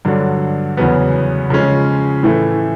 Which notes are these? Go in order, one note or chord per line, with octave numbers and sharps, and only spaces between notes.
G2 D3 F#3
E2 C#3 F#3 B3
C#3 F3 G#3 C#4
A2 E3 A3